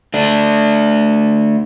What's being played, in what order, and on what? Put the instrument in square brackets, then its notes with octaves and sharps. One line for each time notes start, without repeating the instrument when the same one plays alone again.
[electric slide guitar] A3 D4